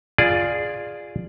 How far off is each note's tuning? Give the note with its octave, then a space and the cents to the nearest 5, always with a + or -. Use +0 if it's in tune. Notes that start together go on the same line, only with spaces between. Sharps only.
F4 +0 G#4 -5 D5 +5